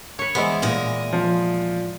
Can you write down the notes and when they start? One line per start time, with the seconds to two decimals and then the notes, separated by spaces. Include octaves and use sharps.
0.19 B4 C#5
0.35 E3 G#3 B3 C5
0.62 A#2 E4 D#5
1.13 F3